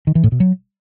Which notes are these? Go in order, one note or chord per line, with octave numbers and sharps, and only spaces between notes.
D#3
E3
A2
B2
F#3